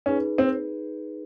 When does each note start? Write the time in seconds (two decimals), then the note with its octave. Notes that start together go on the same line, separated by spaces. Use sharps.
0.06 C#4 D#4 G#4 B4
0.38 C4